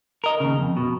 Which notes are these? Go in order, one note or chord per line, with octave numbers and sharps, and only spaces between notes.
A#4 D#5
D#2 C#3
F2
B2